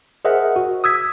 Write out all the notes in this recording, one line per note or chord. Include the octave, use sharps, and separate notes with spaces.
G#4 A#4 C5 D#5 E5 F#5
F#4
D#6 E6 G#6 B6